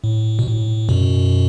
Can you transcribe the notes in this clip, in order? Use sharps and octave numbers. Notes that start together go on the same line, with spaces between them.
A2
B2
A2
F#2 B2